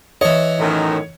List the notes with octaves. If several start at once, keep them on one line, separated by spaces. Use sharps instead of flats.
E3 C#5 D#5
F#2 A2 D#3